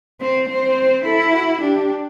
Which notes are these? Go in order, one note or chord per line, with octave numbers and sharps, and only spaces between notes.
C4 C5
C4 C5
E4 A4
F#4
D4 G4